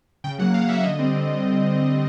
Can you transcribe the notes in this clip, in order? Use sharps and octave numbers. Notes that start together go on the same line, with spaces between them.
C#3 G5
F#3 A#3 F#5
C#3 F5
F#3 A#3 E5
D3 D#5
G3 C4
D3